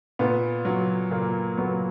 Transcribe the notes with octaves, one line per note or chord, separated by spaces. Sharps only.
A#2 B3
F#3
A#2 A#3
F#3 B3